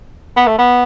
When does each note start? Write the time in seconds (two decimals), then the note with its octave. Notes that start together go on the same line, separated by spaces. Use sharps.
0.37 B3
0.47 A3
0.58 B3